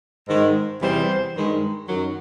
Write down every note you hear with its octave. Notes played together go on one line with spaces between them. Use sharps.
G#2 D#3 G#3
E2 C3 E3 G3 C5
G2 D#3 G#3
F#2 D#3 F#3